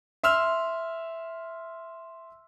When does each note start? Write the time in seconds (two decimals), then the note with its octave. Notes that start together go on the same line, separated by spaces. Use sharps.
0.24 E5 C6 E6 F6